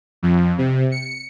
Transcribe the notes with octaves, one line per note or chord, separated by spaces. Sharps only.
F2
C3
C#7